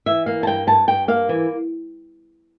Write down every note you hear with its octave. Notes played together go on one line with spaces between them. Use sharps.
E3 E5
A#3 F5
A5
G2 G5
G2 A5
G2 G5
A#3 F5
E3